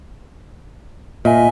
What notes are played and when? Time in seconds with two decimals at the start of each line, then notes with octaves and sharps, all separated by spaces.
1.25 A#2 D#5 E5 G#5